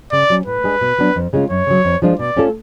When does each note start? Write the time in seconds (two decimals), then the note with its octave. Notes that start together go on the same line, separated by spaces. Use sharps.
0.12 C#3 D5
0.30 F#3 C#4
0.46 A2 B4
0.64 G#3 D4 G#4
0.81 B2
0.98 F#3 B3 D4
1.16 F2
1.33 C#3 G#3 C#4 F4
1.50 F#2 C#5
1.67 C#3 F#3
1.85 F2
2.02 F3 G#3 D4 F4
2.19 B2 D5
2.36 A3 C#4 F4 A4